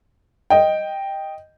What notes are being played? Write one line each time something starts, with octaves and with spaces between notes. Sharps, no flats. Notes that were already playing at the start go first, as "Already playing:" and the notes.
D#5 G5